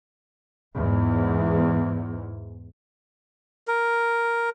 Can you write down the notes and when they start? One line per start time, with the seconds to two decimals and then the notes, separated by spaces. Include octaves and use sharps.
0.75 E2 G#2
3.68 A#4